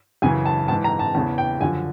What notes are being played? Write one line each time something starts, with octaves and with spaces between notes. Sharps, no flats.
F#2 C#3 E3 G#5
A5
G#2 E3 A5
A#5
A5
E2 C#3 E3 A5
G5
F#2 D3 F3 G#5